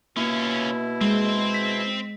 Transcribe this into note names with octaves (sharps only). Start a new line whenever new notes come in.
B2 A#3 C#4 E4 F4
G#3 C4 C5
B6